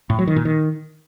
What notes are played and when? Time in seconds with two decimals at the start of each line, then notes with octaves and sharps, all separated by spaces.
0.10 A2
0.19 F#3
0.27 D#3
0.36 A#2
0.45 D#3